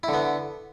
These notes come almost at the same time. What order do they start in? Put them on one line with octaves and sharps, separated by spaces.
E4 D3 B3